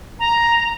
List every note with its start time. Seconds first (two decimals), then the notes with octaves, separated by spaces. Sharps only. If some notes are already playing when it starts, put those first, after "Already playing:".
0.19 A#5
0.58 A#5